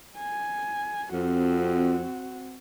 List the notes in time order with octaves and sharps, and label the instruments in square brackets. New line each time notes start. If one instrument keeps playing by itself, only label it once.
[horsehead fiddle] G#5
[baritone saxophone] F2 [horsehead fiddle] C4 F#4